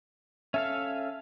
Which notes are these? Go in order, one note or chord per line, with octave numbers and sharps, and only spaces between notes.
C#4 A4 E5 F5